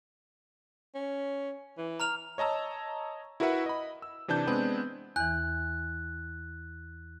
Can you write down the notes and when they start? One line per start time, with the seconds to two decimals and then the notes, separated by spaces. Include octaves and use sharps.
0.95 C#4
1.78 E3
2.00 A#5 F6 F7
2.38 C#5 D#5 A5 A#5 E6
3.40 E4 F#4 A#4 B4 E5 F#5
3.66 D#5 B5
4.02 E6
4.28 C3 E3 D4 A5 G6
4.47 G#3 B3 C4 D4 G#4 B4
5.16 E2 E3 F#6